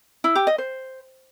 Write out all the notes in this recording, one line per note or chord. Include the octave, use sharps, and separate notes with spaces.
E4
G4
D#5
C5